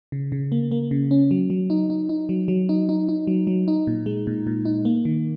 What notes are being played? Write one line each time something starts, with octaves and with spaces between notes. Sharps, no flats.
C#3
C#3
A#3
A#3
C#3
C#4
F#3
F#3
D#4
D#4
D#4
F#3
F#3
D#4
D#4
D#4
F#3
F#3
D#4
A#2
G#3
A#2
A#2
D#4
A#3
D#3